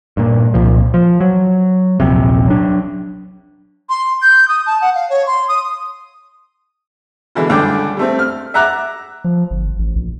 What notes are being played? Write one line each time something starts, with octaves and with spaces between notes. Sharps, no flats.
G2 A#2
C2 A#2 F3
F3
F#3
D#1 A#1 C3
F#3 D4
C6
G6
D#6
A5
F#5
F5
C#5
C6
D#6
B2 D3 E3 G#3
C#2 G2 D3 D4 G5 D6
G3 A3 C4
F6
E5 F#5 A#5 D6 F#6
F3
G1
A1
A#1